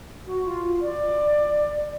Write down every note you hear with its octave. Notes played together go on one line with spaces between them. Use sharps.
F#4
F4
D5